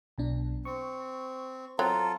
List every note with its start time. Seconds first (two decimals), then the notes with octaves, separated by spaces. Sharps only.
0.18 B1 B2 D4
0.65 C4 C#6
1.79 F#3 C4 F4 A4 A5 A#5